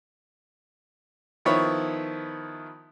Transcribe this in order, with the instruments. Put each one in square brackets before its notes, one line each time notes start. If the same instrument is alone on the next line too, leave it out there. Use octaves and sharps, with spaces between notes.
[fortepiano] D#3 F3 B3 E4 C#5